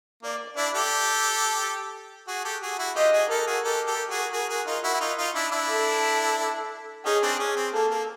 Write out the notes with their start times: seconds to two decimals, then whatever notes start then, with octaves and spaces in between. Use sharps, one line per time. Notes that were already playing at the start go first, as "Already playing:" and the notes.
0.23 A#3 D5
0.57 D4 E4 D5
0.74 G4 A4
2.28 F#4 G#4
2.44 G4 A4
2.62 F#4 G#4
2.78 E4 F#4
2.96 F4 G4 D#5
3.13 F#4 G#4
3.30 G4 A4 A#4
3.47 F#4 G#4
3.64 G4 A4 A#4
3.87 G4 A4
3.99 A#4
4.10 F#4 G#4
4.33 F#4 G#4
4.49 F#4 G#4
4.67 D#4 F4
4.83 E4 F#4
4.94 E4
5.00 D#4 F4
5.18 D#4 F4
5.35 D4 E4
5.52 D4 E4
5.69 A4
7.05 C#4 D#4 G#4
7.22 C4 D4
7.39 C#4
7.56 C4
7.74 A#3 A4
7.91 A#3